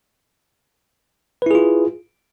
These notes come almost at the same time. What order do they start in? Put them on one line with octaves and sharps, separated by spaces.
B4 E4 G#4 F4